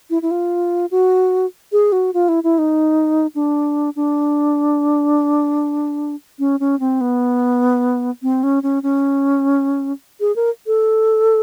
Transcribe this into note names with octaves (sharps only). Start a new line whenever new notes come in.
E4
E4
F4
F#4
G#4
F#4
F4
E4
E4
D#4
D4
D4
C#4
C#4
C4
B3
C4
C#4
C#4
C#4
G#4
A#4
A4